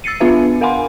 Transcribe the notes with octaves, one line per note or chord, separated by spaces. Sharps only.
E6 A6 C7 C#7 D#7
B3 D4 F4 B4 E5
A#4 F5 F#5 G#5 B5 C6